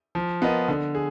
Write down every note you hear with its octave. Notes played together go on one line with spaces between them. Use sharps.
F3
B3 F4 A#4 D#5
D3
G#4